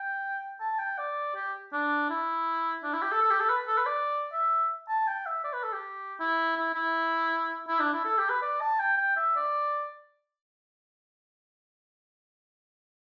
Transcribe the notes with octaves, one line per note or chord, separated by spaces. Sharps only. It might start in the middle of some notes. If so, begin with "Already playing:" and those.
Already playing: G5
A5
G5
D5
G4
D4
E4
D4
E4
G4
A4
A4
G4
A4
B4
A4
B4
D5
E5
A5
G5
E5
D5
B4
A4
G4
E4
E4
E4
E4
D4
E4
A4
G4
B4
D5
A5
G5
G5
E5
D5